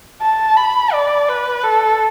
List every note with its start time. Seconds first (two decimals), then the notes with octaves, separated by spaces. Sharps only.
0.21 A5
0.57 B5
0.93 D5
1.29 B4
1.63 A4